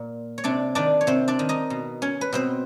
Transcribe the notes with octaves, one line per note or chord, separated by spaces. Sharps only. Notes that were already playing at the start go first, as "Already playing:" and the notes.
Already playing: A#2
C#5
C3 D4 D5
D#3 D4 D5
C#5
C3 C4 C5
D4 D5
D#3
D#4 D#5
B2
C#4 C#5
B4
B2 C4 C5